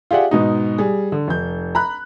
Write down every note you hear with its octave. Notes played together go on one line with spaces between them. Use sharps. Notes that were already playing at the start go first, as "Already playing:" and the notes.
F4 G4 G#4 D5 E5 F#5
G#2 B2 D#4
G3 G#4
D3
F1 G6
A#5 B5 F#6